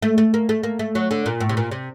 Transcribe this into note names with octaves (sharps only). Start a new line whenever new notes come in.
A3
A3
A#3
A3
A#3
A3
F#3
D3
A#2
A2
C3
A#2
C3